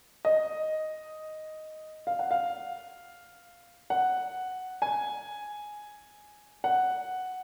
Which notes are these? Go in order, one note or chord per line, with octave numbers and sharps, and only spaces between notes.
D#5
F5
F#5
F5
F#5
G#5
F#5